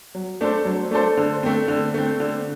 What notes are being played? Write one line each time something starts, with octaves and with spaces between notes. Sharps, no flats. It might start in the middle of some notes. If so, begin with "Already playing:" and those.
F#3
A3 D4 A4 C5
F#3
A3 D4 A4 C5
D3
A3 C4
D3
A3 C4
D3